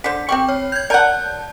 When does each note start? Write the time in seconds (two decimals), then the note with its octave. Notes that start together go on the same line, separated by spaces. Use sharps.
0.04 D3 C5 B6
0.29 C4 G4 G5 C#6
0.48 C#5 F6
0.72 G6 G#6
0.90 A#4 D5 F#5 A5 G6